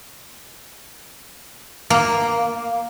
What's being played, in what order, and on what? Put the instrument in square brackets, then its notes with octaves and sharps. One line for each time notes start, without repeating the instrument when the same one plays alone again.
[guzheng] A#3